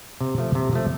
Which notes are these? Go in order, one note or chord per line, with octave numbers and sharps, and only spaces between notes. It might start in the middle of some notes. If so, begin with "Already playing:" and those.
C3
F3 A3
C3
F3 A3